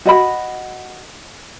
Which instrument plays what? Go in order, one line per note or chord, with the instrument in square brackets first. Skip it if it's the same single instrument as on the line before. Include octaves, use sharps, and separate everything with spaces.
[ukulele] F#4 D#5 B5